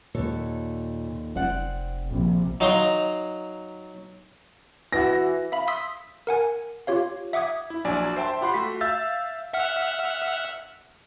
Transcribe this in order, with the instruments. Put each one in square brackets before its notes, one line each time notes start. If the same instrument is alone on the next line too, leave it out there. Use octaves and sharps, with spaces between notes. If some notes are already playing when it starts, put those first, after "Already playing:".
[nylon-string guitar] D#2 A4 C#5 [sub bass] A#2
[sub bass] F1 [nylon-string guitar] C4 D5 F#5
[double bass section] A#1 C3
[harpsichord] F#3 D#4 F5 A#5 C6
[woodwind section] E3 [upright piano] F#4 A#6
[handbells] E5 F5 B5
C6 D#6 E6 B6
A#4 F#5 G#5
F4 G4 C#5 F5
E5 F#5 D6 D#6 G#6
[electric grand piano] E4
A#1 F#3 D4 D5 G#5
C5 E5 G5 A5 C6
F4 G4 F#5 B5 C6 C7
A3 F#4 B6
E5 F5 E6 G6 A6
[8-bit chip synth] E5 F#5 F6